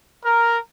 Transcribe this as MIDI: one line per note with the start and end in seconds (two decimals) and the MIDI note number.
0.23 0.57 70